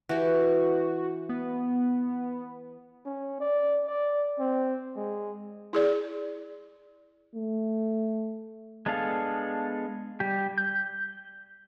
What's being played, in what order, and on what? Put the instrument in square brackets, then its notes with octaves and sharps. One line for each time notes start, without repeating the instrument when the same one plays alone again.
[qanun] E3 G4 [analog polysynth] F#4
[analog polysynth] B3
[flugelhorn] C#4
D5
D5
C4
G#3
[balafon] E4 G#4 D5
[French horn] A3
[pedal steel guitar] G#3 B3 D4 A4 F5
G3 G4
G6